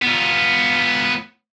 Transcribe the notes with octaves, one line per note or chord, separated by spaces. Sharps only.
B3 F4